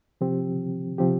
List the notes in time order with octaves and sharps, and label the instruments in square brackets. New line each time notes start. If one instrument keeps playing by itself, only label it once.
[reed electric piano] C3 F3 C4 G4
C3 F3 C4 G4